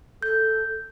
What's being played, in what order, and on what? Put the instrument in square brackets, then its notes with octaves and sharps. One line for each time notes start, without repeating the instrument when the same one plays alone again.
[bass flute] A4 [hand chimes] G6